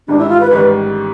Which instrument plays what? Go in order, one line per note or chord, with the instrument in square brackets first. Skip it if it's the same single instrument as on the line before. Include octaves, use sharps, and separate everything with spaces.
[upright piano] A1 G#2 D#3 G3 [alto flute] D4
[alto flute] E4
F4
B4
[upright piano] A1 G#2 D#3 G3 [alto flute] B4